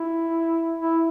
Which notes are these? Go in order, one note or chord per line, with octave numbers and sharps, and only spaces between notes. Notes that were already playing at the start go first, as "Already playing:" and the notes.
Already playing: E4
E4